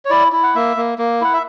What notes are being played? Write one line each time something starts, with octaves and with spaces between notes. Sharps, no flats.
C#5
E4 D5
E4
F#5
A#3 E5
A#3
A#3
E4 F#5
E5